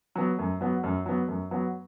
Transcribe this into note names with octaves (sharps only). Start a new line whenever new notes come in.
F#3 B3
F#2
F#3 B3
F#2
F#3 B3
F#2
F#3 B3